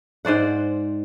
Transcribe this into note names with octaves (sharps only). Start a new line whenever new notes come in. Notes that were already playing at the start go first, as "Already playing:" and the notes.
G#2 C5 D5 F#5